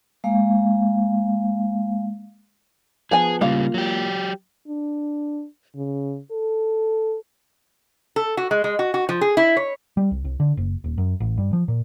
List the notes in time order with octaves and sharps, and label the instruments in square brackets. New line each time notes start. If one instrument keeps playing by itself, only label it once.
[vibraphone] G#3 A#3 F5
[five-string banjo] F3 B3 G#5 [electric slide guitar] G#4
[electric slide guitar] C#3 G3 [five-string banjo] A#3 F4 F5
[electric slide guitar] F#3 G4
[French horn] D4
C#3
A4
[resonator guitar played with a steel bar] A4
F#4
G#3
G#3
F#4
F#4
F3
G#4
E4
C#5
[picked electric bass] G3
C2
C2
D3
F#1
D#1
F#2
A1
G2
F3
A#2